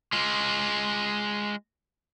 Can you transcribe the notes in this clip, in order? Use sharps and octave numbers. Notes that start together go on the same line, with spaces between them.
G#3 F4